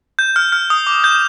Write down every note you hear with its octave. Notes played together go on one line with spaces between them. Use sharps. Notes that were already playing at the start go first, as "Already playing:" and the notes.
G6
F6
F6
D#6
D6
G6